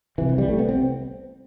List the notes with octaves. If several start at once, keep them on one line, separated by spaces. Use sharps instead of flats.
C2 C3 E3
E3
G3
C2 C3 A3
B3
C4